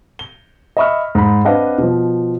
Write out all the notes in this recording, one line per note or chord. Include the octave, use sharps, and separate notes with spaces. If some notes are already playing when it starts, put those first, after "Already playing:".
G7
D#5 E5 B5 C#6 D#6 F6
G#2 B5
C4 D4 B4 D#5 F5 F#5
B2 F3